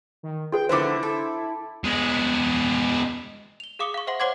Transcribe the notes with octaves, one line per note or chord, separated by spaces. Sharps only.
D#3
F4 G#4 B4 G5
D3 F3 G#3 E4 B4 C5 E5 D6
A4
G#3 B3
F7 G7
G#4 F5 D6 D#6 C#7 G7
F5 C#6
C5 E5 F#5 C6
C5 C#5 F#5 C6 D6 G#6